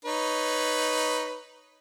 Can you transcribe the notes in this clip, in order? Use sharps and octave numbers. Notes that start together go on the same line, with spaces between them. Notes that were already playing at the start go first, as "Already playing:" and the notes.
D#4 B4 C#5